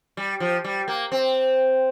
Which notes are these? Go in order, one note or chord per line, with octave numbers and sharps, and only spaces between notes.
G3
F3
G3
A#3
C4